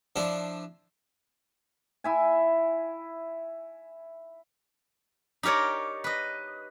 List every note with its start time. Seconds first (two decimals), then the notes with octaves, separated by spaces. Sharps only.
0.16 F3 D4 E4 C5
2.04 E4 E5 G#5
5.43 D#4 G4 A#4 C#5 D5
6.04 B4 D#5